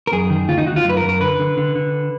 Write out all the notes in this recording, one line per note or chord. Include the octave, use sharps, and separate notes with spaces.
A#4
F#2 G#4
D#3
D2 F4
D#4
D2 F#4
F4
F#2 B4
A#4
F#2
A#4
D3 B4
D3
D3
D3